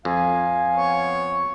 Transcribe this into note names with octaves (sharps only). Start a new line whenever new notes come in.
F2 F5 G#5
B3 C#5